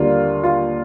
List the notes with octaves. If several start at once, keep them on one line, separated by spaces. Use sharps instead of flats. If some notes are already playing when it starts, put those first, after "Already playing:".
Already playing: D#2 D3 G3 A#3 F4
F4